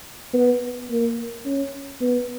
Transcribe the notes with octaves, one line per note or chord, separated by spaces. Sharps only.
B3
A#3
C#4
B3